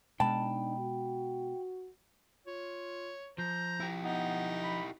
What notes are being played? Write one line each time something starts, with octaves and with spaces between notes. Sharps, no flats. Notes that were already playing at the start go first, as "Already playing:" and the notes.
B2 G#3 D4 D#4 G5 A5 B5
F#4
F4 C#5
F3 C5 A#5
E4 G4
B3 D#4
B5